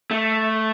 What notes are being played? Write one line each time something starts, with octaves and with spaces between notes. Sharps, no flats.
A3